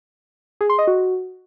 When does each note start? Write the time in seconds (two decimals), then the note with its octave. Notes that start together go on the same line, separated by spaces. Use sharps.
0.61 G#4
0.70 C6
0.78 D#5
0.87 F#4